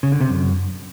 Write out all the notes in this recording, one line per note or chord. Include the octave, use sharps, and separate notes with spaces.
C#3
D3
C3
F#2